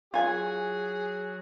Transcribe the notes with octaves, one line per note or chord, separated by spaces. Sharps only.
F#3 F4 F#4 G#4 G#5